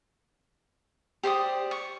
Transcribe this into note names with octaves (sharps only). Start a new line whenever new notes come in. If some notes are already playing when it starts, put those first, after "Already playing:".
G4 C5 D5 D#6
C#6